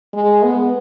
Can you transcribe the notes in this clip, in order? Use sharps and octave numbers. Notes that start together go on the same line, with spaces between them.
G#3
B3